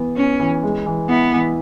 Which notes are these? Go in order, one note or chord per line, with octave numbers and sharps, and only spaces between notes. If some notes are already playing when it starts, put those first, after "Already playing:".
Already playing: E3 B3
B3 C#4
E3
G#3
E3
B3 E4
E3